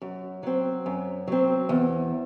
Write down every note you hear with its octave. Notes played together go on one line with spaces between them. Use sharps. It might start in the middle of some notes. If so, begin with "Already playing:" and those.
F#2
F#3 C4
F#2
F#3 C4
E2